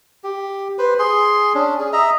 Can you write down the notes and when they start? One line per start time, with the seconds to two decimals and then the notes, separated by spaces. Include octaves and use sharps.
0.24 G4
0.79 B4 C5
0.99 G#4 C6
1.55 C#4 D4
1.80 G#4
1.93 D#5 E5 A#5